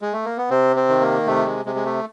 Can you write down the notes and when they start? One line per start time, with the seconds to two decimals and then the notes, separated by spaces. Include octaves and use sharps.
0.01 G#3
0.13 A3
0.25 A#3
0.37 B3
0.50 C3 C4
0.76 C4
0.89 D#3
1.01 A#3
1.27 C3 A3
1.46 G#3
1.65 C3 G#3
1.75 G#3
1.85 A3